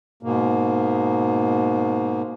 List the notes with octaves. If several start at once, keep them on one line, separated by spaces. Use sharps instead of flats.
G#2 B2 A#3